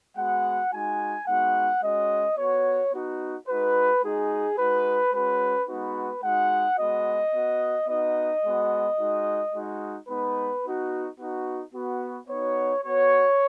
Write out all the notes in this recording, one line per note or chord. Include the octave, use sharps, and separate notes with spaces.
G#3 B3 F#4 F#5
G#3 D#4 F#4 G#5
G#3 B3 D#4 F#4 F#5
G#3 C#4 F#4 D#5
B3 F#4 C#5
B3 D#4 F#4
G#3 D#4 F#4 B4
G#3 D#4 F#4 G#4
G#3 D#4 F#4 B4
G#3 C#4 F#4 B4
G#3 B3 D#4 F#4 B4
G#3 D#4 F#4 F#5
G#3 B3 F#4 D#5
B3 F#4
B3 D#4 F#4 D#5
G#3 B3 F#4
G#3 D#4 F#4
G#3 D#4 F#4
G#3 B3 D#4 B4
B3 D#4 F#4
B3 D#4 F#4
B3 F#4
B3 D#4 F#4 C#5
B3 F#4 C#5